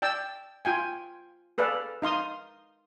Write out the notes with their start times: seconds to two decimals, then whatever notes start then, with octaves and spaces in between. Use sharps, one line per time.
0.02 D5 G5 A5 E6
0.65 F4 G5 G#5
1.58 G#4 A4 B4 D5 F5
2.02 D#4 F5 C6 D#6